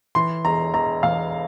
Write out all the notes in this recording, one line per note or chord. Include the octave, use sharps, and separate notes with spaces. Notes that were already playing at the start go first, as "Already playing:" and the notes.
E3 C6
E1 A#5
E1 A#5
E2 F5